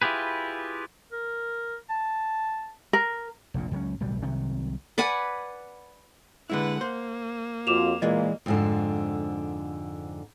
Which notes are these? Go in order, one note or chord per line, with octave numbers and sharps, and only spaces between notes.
E4 F4 G4 G#4 B4
A#4
A5
A#4
F1 A#1 A#2
C#2 F#3 C#4
D1 B1 F#3 G3
C2 C3 D#3 F#3
B4 D5 F#5 G#5
D3 G#3 E4 B4 F#5
A#3 C5
F2 F4 F#4 D6 E7 F7
A#2 E3 G#3 D#5
F2 G#2 D3